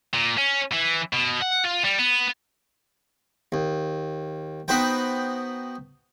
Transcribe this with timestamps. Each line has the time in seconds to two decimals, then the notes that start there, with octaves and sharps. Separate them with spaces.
0.14 A#2
0.38 C#4
0.73 E3
1.13 B2
1.42 F#5
1.65 F4
1.85 G3
1.99 B3
3.52 D#2
4.68 B3 D#4 F#4 B4 C5 G5